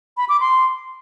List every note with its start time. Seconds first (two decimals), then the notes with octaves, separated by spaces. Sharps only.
0.17 B5
0.29 D6
0.40 C6